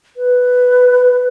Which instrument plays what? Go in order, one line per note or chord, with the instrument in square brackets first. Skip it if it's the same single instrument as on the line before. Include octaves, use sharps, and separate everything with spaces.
[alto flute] B4